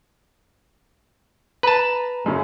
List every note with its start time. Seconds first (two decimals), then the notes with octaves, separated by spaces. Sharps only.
1.63 B4 A5 A#5
2.26 F#2 C#3